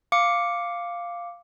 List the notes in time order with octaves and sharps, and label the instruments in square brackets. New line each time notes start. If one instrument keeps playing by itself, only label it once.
[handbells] F5 D6 C#7